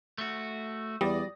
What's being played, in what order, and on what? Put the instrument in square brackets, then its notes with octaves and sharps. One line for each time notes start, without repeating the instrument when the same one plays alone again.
[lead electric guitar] A3 F#4
[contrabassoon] E2 [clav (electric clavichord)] G3 [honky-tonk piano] D5 D#6 A#6